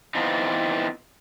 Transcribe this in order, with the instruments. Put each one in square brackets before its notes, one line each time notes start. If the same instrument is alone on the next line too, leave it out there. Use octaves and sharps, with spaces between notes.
[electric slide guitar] E3 B3 C4 D#4 F4